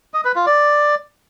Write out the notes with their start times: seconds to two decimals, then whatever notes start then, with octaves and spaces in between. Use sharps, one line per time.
0.14 D#5
0.25 B4
0.36 F4
0.47 D5